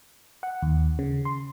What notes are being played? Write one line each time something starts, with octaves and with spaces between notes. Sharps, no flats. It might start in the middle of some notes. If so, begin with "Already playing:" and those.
F#5
D#2
C#3
C6